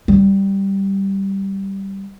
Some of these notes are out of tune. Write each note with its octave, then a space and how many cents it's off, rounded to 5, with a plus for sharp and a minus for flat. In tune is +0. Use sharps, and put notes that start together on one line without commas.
G3 -5